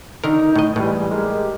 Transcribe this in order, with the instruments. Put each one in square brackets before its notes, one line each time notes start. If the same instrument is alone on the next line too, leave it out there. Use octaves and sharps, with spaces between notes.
[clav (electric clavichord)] D3 D#3 A#4 [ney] D#4
[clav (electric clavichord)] A2 D#5
[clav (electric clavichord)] A2 [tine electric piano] E3 G3 [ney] G#3
[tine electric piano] G#3 A#4 [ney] G4